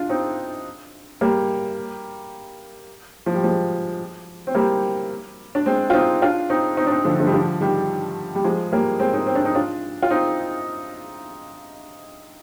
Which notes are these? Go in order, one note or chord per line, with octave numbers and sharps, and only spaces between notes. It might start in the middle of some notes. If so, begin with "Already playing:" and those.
Already playing: D4 F4
C4 D#4
G3 A#3
F3
G3
F3 G#3
C4
G3 A#3
D4
G#3 C4
F4
C4 D#4
D4 F4
C4 D#4
C4 D#4
D4
C4 D#4
D3 F3
D3 F3
G3
D3 F3
D#3 G3
G3
F3 G#3
G3 A#3
G#3 C4
C4 D#4
C4
D4
D#4
D4 F4
F4
C4 D#4